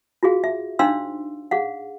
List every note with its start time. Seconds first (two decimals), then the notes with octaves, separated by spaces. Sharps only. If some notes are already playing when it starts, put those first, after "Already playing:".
0.23 F4 F#4 G#4 F5
0.44 E5
0.79 D4 D#4 C5 F5 C6 E6
1.51 G#4 F5 F#5